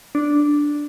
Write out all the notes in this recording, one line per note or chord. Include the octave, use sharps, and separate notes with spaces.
D4